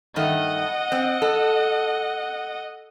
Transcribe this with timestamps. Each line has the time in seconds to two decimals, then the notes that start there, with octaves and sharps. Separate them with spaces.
0.16 G2 D#3 A3 D#5 F#5
0.92 C4
1.22 A4